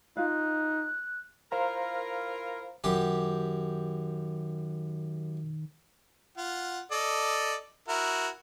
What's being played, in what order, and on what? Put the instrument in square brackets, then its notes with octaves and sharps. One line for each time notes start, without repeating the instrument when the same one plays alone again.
[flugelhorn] D#4 [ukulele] F4 F5 [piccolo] F#6
[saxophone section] E4 F4 A#4 [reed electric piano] C5 F5 A#5
[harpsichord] F#2 G4 [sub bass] D#3
[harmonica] F4 F#5
A4 D5 D#5
E4 F#4 A#4